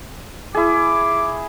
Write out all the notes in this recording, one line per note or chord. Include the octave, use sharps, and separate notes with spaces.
E4 G#4 D6